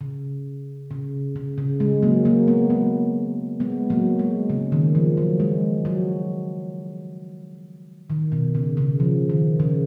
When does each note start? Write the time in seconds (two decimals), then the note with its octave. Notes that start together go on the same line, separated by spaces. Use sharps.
0.01 C#3
0.91 C#3
1.36 C#3
1.58 C#3
1.80 G#3
2.03 F#3 A#3
2.25 F#3 A#3
2.47 G#3 B3
2.70 F#3 A#3
3.60 G#3 B3
3.90 F#3 A#3
4.19 G#3
4.50 C#3
4.72 D#3
4.95 F3
5.17 F#3
5.40 G#3
5.85 F#3
8.10 D#3
8.32 B2
8.55 C#3
8.77 C#3
9.00 F3
9.29 D#3
9.60 C#3